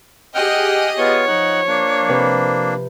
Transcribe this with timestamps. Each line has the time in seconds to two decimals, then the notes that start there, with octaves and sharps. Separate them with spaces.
0.35 G4 G#4 D#5 F#5 G5 F6
0.98 B3 F4 C#5
1.27 F3 D#4 F#5
1.68 A#3 D4
2.09 C3 B4 B5